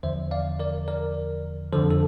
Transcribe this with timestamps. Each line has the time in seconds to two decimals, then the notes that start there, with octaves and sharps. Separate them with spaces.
0.03 E2 D3 F3 C5 E5
0.31 D5 F5
0.60 A#4 D5
0.88 A#4 D5
1.72 F2 D3 F3 A4 C5
1.90 A4